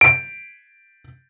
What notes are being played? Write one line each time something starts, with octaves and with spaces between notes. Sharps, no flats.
D7